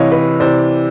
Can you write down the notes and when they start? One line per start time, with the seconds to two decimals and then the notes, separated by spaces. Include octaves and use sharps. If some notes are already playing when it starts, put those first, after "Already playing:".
Already playing: C3 E3 C#5 D#5 F5
0.11 B4 C#5
0.40 C3 E3 C5 D5